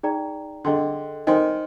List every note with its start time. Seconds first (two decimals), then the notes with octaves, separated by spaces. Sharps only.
0.03 D#4 G#4 D5 G5 A#5
0.65 D3 G#4 D#5 G5 C6
1.27 D#3 C5 D#5 G#5 C6